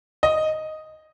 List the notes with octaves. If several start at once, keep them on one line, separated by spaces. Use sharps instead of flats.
D#5